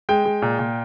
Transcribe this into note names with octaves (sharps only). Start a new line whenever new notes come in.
G#3 G5
G#3
A#2
A#2